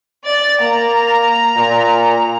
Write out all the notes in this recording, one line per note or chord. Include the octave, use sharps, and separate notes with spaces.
D5 A6
A#3 A#5
A#2